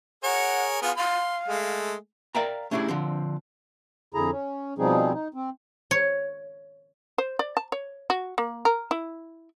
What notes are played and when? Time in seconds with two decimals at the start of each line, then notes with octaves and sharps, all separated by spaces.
0.24 G#4 A#4 C#5 F#5
0.82 B3 F4 G#4 F5
0.97 F5 C6
1.48 G#3 A3 G#4
2.35 A#4 D5 E5 F5 G5 A#5
2.71 A3 C#4 D4 E4 G4 G#4
2.88 D3 F3 C4
4.14 F2 D3 E4 G#4 A#5
4.31 C#4
4.78 B2 F3 G3 C4 D#4 G#4
5.13 D#4
5.34 C4
5.91 C#5
7.18 C5
7.39 D5
7.57 A5
7.72 C#5
8.10 F#4
8.38 A#3
8.65 A#4
8.91 E4